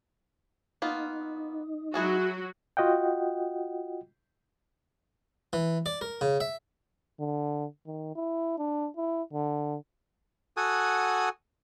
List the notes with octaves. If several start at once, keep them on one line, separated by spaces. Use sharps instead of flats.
A#3 B3 D#4 F4
F#3 E4 F#4 G#4 A4
F4 F#4 D#5 F#5 G5
E3
D5
A#4
C#3
E5
D3
D#3
E4
D4
E4
D3
F#4 A4 F#5 G#5 D#6